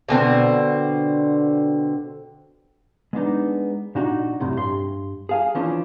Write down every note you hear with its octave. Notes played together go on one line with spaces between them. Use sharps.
B2 D3 C4
G#3 B3 D4 D#4
A#2 D4 D#4 F#4
C2 F#2 A2 C3
G2 C6
G#4 F5 G#5
E3 F3 C#4 D4